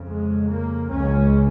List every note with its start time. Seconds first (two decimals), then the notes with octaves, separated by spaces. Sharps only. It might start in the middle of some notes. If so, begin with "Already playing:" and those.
Already playing: F2 C#3
0.08 G#3
0.50 A#3
0.90 C#2 C#3 C#4